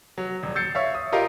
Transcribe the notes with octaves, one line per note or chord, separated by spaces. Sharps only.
F#3
D#1
E6 G6 A6 C7 C#7
C#5 E5 F5
D#6
F4 G4 A#4 D#5 F5